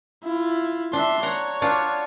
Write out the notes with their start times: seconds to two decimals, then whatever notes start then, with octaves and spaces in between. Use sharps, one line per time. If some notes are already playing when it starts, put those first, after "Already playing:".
0.24 E4 F4
0.93 D4 E5 C6
1.23 C#5 F#5 A#5
1.62 D4 F4 F#4